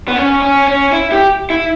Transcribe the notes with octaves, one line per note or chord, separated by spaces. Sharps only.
B3
C#4
C#4
C#4
E4
G4
E4